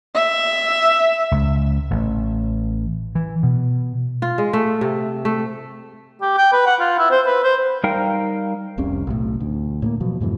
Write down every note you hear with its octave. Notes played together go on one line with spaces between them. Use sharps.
E5
C#2
A1
E3
B2
F4
G#3
A3
C3
A3
G4
G5
B4
F#5
F4
E4
C5
B4
C5
G3 D#4 A#4 F5 G5
F1 C2 C3 C#4
B1 A2
D2
A2 A3 A#3
B2 F3 F#3
F2 G#2 B2 E3